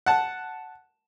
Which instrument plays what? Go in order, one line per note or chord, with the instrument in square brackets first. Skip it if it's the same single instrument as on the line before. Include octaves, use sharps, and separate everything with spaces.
[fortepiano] F#5 A5